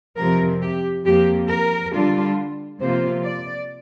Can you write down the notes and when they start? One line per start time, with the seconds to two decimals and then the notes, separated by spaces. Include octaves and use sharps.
0.17 F2 C3 F3 A#4
0.61 G4
1.05 F2 F3 A#3 G4
1.49 A#4
1.93 D3 G3 D4 F4
2.81 C3 F3 A#3 F4 C5
3.24 D5